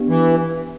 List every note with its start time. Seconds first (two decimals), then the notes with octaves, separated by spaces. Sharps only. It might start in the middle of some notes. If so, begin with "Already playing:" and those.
Already playing: B3 D4 G4
0.09 E3